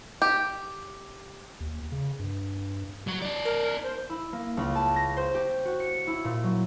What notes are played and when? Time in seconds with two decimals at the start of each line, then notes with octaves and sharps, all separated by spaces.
0.22 G4
1.60 D#2
1.92 C#3
2.20 G2
3.07 F#3 F#4
3.22 D#4 D5
3.45 A#4
3.83 C5
4.10 E4
4.33 A#3
4.57 C#2
4.75 A5
4.96 A#6
5.17 C5
5.34 G4
5.65 F#4
5.80 C#7
6.07 E4
6.24 A#2
6.43 F#3